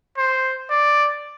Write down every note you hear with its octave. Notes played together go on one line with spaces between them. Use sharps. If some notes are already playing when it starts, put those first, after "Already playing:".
C5
D5